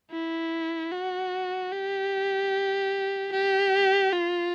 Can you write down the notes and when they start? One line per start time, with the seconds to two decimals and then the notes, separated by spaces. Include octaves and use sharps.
0.11 E4
0.92 F#4
1.72 G4
3.32 G4
4.13 F4